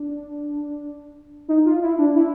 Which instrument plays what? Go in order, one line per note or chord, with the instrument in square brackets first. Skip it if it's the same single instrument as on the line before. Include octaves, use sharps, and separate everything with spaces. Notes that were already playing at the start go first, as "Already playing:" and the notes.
Already playing: [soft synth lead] D4
D#4
F4
E4
D4
E4